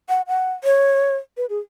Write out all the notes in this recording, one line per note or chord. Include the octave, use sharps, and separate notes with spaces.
F#5
F#5
C#5
B4
G#4